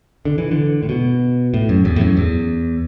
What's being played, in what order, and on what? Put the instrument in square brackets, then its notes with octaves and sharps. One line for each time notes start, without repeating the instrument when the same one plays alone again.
[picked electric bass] D3
E3
D3
A2
B2
A2
F#2
E2
A2
F#2
E2